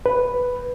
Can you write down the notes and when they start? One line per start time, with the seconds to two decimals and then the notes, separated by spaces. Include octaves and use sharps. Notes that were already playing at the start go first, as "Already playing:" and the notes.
0.06 B4